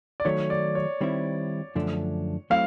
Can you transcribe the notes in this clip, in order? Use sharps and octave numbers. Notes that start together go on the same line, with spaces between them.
D5
D#3 F#3 A3 C#5
D5
C#5
D#3 G3 C4 E4
F#2 D3 F3 A3 D4
F#3 A3 C4 E4 F5